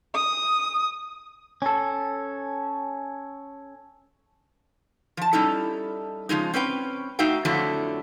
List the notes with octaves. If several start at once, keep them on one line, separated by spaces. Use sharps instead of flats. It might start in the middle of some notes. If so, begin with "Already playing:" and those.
D#6
C#4 A4
F3 A5
G3 C#4 D#4 E4 A4
C#3 F3 G#3 D#4
C4 C#4 B4 G5
A3 D#4 F#4 E5 F5 G5
F2 D3 F3 F#3 A3 E4